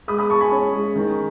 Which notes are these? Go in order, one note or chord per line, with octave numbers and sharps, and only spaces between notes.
G#3 B5 D#6
B5 D#6
G#3 A5 C#6
G#5 B5
C#4
G#3
D#3